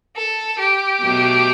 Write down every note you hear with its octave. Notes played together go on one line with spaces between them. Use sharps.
A4
G4
B2 F#3 A3